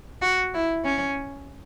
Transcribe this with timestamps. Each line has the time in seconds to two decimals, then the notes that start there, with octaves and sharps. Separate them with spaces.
0.22 F#4
0.54 E4
0.84 C#4